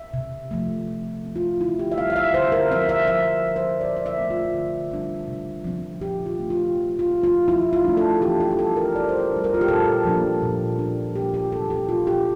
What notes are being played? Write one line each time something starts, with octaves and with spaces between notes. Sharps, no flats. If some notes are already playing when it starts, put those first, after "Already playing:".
Already playing: E5
C3
F3 A3
F3
C4
F4
D3 E4
G4
E5
G3 C4 F5
F5
E5
D3 C5
A#4
F3 C4 E5
E5
F3 E5
C4
C5
A#2 D5
D5
E5
F3 A3 C4
F4
D3
G3 D4
C3
F3 C4
A#2 G4
F4
A3 C4
F4
F3
F4
C4
F4
F3 E4
F4
A3 D4
A4
E3 G4
G4
G4
G3 C4 A4
A#4
E3 D5
C5
A#4
G3 D4
A#4
F4
G4
A#2 A4
F3 A#3 D4
A#2
F3 A#3 D4
C3 G4
G4
E3 A3 A4
G4
A#2 F4
G4